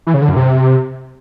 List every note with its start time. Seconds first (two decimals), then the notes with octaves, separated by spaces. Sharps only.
0.07 E3
0.14 C#3
0.22 D3
0.29 F#2
0.36 C3